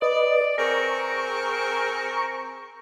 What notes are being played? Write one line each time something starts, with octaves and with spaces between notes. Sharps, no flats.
B4 D5 D#5
C4 G#4 A#4 A#5 C#6